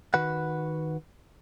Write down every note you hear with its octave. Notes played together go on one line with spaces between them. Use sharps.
D#3 F#4 B4 F#5